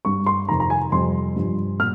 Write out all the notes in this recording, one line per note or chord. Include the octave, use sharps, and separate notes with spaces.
G2 G3 C#6
C6
F2 C3 D#3 A#5
A#5
G#5
F2 C3 G3 C6
G2 F3
A#2 G3 F6